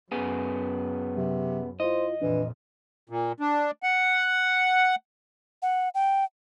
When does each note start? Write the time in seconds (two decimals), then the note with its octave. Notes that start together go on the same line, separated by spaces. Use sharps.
0.12 F#2 C#3 B3 G#4
1.17 C3 F#3
1.80 E4 F4 C5 D#5
2.22 F2 A#2 E3 D4 B4
3.09 A#2
3.40 D4
3.83 F#5
5.62 F#5
5.95 G5